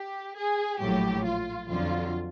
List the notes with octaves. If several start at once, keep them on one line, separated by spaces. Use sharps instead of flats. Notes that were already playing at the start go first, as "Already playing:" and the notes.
Already playing: G4
G#4
A#1 A2 F#3 G4
F4
F2 D3 F#3 F4